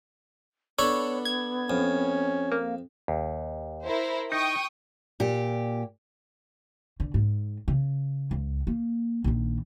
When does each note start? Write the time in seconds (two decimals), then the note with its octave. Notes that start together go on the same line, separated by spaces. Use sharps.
0.79 B3 D4 A4 C#5 B5
1.25 G#6
1.70 F2 C#4
2.51 A#3
3.08 D#2
3.83 E4 A#4 C5
4.32 D#4 G5 C#6 D#6
5.20 A#2 G4
7.00 D3
7.14 G#2
7.68 C#3
8.31 C#2
8.67 A#3
9.24 A#1 D#3